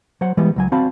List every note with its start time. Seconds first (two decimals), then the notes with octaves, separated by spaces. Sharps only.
0.21 F#3 C5 F#5
0.37 E3 G3 G#3 B3
0.56 C#2 F#3 G#5
0.72 C4 F#4 D5 F5 A5 B5